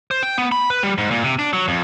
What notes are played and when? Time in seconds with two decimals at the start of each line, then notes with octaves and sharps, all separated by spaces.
0.11 C5
0.23 G5
0.38 B3
0.52 B5
0.70 B4
0.83 G3
0.98 G#2
1.11 A#2
1.24 C3
1.39 D4
1.53 F#3
1.68 F2